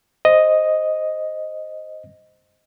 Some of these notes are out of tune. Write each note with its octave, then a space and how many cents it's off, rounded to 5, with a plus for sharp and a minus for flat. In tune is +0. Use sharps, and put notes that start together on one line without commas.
C5 +0 D#5 +0